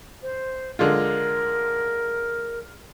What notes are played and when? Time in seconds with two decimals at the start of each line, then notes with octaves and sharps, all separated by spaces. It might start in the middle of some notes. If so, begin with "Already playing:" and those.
0.23 C5
0.79 D3 G#3 F4 A#4